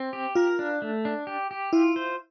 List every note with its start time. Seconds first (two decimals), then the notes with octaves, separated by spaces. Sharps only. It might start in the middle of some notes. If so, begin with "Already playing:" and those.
Already playing: C4
0.13 G4
0.35 F4 A#4
0.59 D4
0.82 A3
1.05 D4
1.27 G4
1.51 G4
1.73 E4 F4
1.96 C5